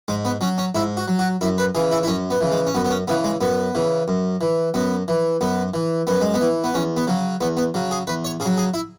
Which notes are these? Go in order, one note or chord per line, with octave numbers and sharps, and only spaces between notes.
G#2 G#3
B3
F#3 C#4
C#4
G#2 E4
F#4
F#3
F#4
F#2 E4
B4
C#3 E3 G#4
E4
E4
F#2 C#4
B3
C#3 E3
G#3
C#4
F#2 B3
B3
C#4
C#3 E3 B3
G#3
F#2 B3
C#3 E3
F#2
E3
F#2 B3
E3
F#2 B3
E3
F#2 B3
G#3
B3
E3
B3
E2 C#4
B3
C#3 F#3
E2 B3
B3
C#3 F#3
G#4
E2 B4
C#5
C#3 G#4
F#3
G#4
E4